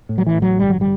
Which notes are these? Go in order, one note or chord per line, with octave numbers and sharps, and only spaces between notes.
A2
F#3
E3
A1
F#3
G1 G3
F#3
G3